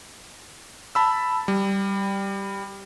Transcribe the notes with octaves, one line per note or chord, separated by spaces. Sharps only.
A5 B5 E6
G3